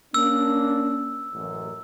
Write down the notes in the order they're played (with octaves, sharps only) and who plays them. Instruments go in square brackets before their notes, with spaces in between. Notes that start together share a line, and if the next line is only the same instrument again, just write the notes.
[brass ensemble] A#3 C#4 D4 [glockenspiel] E6
[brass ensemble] A1 F#2